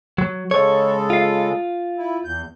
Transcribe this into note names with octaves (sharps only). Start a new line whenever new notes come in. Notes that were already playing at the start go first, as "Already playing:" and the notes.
F#3
C#3 G#3 A4 C#5
F4 F5
E4
E2 G6